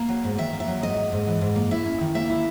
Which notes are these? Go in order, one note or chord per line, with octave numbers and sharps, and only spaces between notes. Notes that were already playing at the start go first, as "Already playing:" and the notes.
Already playing: A#3
F#3
G#2
D#3 E5
A#3
E5
F#3
G#2 D#5
A#3
G#2
E3
G#2
A#3
E4 E5
C#4
D#3
A#3 E5
E4